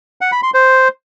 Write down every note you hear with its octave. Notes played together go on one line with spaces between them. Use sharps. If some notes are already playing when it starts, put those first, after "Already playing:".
F#5
B5
C6
C5